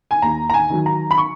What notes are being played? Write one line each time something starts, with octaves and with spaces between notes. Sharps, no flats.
G#5
D#2 A#5
A#5
G#5
D#3 F#3
A#5
B5
C#6